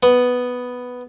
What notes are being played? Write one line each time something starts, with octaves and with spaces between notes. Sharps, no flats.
B3